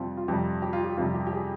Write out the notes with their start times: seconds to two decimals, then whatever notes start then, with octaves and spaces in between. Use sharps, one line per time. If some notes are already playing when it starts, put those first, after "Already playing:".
Already playing: F2 C3 G3 C4 F4
0.17 F4
0.28 F2 C3 G3 G4
0.62 G4
0.73 F4
0.84 G4
0.97 F2 C3 G3 F4
1.14 G4
1.27 G4
1.33 G#4